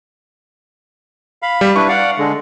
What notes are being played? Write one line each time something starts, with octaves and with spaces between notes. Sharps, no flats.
F5 B5
G3
D4 E4 B4 C#6
D5 F5 F#5
D3 G#3